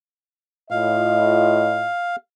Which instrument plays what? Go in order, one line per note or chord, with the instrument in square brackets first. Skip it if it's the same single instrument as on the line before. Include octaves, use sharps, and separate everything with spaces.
[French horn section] A2 F4 D#5 [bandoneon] F5